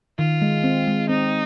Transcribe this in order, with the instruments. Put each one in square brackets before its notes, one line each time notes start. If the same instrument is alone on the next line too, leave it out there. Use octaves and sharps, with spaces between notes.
[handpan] D#3 [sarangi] F4
[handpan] G#3
C4
G#3
[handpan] C4 [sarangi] D#4